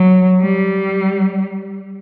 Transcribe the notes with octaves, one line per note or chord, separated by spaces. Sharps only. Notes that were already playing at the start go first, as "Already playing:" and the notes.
Already playing: F#3
G3